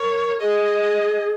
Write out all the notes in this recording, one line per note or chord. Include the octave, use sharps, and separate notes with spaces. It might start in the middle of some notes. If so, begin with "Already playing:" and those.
Already playing: A#4 C#5
G#4 D#5